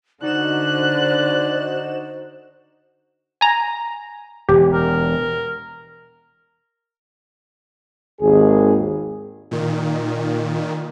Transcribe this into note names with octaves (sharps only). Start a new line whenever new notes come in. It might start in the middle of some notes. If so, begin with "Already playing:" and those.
D3 D#4 F#4 C5 D5 F#6 E7
G#5 A#5
E1 G4
A#4
G#1 D#2 G#4
A#2 D#3